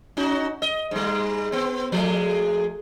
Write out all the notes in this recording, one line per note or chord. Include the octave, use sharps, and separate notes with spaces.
C#4 D#4 F#4
D#5
G#2 G3
B3 C4
F3 G#3 A3